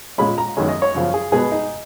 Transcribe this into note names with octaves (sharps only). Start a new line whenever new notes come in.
A#2 G#3 C#4 B5
A#5
F#2 D#3 G#3 C#4
D#5
C#5
F#2 C#3 F3
G#4
B2 G#3 B3 G#4
D#4